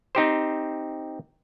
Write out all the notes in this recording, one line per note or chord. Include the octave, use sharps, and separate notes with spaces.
C4 D#4 G4 C5